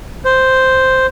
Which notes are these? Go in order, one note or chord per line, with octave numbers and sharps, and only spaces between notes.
C5